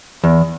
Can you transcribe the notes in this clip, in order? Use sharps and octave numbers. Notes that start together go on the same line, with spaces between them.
E2